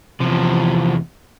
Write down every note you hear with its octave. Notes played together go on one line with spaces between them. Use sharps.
E2 C3 F3